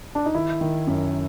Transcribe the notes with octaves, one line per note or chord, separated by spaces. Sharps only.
D4
D#4
D#3 E4
D#3
F#2